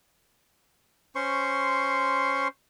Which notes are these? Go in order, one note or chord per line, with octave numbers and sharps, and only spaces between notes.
C#4 C5 C6 C#6